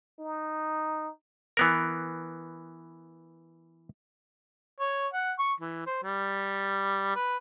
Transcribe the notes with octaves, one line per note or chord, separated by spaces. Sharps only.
D#4
E3 B3 A#4
C#5
F#5
C#6
E3
C5
G3
B4